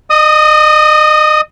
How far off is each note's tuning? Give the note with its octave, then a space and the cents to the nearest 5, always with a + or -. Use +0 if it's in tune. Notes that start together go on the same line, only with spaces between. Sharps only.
D#5 -30 D#6 +10